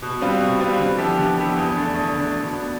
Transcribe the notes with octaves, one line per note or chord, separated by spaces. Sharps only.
B2
G3 C4 F4 B4
B2
G3 C4 F4 B4
D3
F3 B3 E4 G4
D3
F3 B3 E4 G4
E2
D3 A3 D4 A4
E2
D3 A3 D4 A4
B2
B3 D4